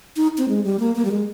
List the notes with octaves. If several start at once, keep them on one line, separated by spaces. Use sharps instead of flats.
D#4
C4
G#3
G3
A#3
A#3
G3
G#3